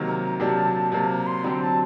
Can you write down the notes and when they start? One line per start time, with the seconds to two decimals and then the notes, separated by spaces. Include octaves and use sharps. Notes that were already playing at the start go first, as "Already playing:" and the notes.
Already playing: C3 D#3 F#3 A#3 A#5
0.40 C3 F#3 A#3 D4 G4 A5
0.92 C3 F#3 A#3 A5
1.09 A#5
1.27 C6
1.44 D3 F#3 C4 G4 A#5
1.61 A5